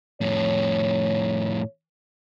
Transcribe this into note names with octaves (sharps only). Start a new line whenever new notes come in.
F2 A2 C#5